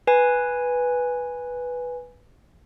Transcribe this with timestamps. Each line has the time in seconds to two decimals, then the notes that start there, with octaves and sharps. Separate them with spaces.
0.07 B4 G#5